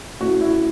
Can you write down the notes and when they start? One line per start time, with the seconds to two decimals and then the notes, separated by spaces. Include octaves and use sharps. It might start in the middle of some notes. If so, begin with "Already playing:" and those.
0.20 A2 A3 C#4 F#4
0.41 E4